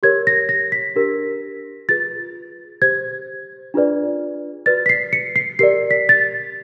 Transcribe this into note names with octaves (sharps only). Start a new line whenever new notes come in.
G4 A#4 C#5 G#6
A#6
A#6
B6
D4 G4 A#4
F4 G#4 B4 A6
G4 C5 G#6
D4 F4 G#4 B4 D5
F#4 B4 D5 A6
B6
C7
C#7
C7
G4 A#4 D5 C7
B6
A6